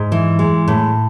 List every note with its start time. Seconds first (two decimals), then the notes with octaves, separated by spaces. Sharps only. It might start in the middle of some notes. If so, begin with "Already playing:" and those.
Already playing: G#2
0.12 E3
0.39 G#3
0.68 A2